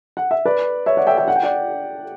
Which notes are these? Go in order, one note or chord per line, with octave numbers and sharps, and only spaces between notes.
F#5
E5
B4 D5
C#5 E5
D5 F#5
E5 G5
E5 G5
F#5
G5
D5 F#5